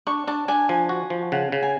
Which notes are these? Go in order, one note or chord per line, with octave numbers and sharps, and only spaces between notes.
D4 C#6
D4 A5
D4 G#5
F3 G#5
F#4
F3
C#3 F#5
C#3
G#5